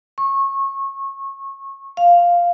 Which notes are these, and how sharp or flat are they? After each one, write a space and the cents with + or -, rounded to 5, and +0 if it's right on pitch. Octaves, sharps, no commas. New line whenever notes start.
C#6 -25
F5 +0